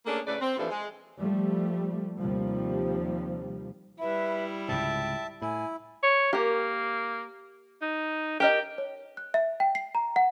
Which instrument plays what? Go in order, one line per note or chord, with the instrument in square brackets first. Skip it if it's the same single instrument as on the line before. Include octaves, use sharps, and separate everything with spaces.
[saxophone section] A3 A#3 C#4 D4 G#4 A4
A2 C#3 A3 B4 D5
C4
D#2 A2 E3 F3 A3 D4
G#3
[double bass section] F3 G3 A3
D#2 C3 F3 G3
[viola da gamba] G3 E4 [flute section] B4 E5 B5
[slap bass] C#2 G#2 C3 [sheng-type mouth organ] E5 A5 [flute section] G5
[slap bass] A2 [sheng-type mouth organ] E4 [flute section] G#5
[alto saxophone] C#5
[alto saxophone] A#3 [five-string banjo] G4 A#4
[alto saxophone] D#4
[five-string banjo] G4 A#4 D#5 [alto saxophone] G5
[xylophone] C#5
F#6
E5
G5
C7
A#5
F#5